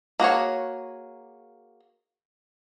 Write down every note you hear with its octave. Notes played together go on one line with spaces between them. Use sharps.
A#3 F#4 G#4 C#5